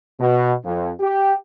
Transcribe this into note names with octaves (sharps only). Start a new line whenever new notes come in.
B2
F2
G4